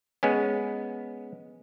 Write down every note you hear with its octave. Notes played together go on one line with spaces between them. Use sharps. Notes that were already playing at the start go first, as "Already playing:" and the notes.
G#3 B3 C#4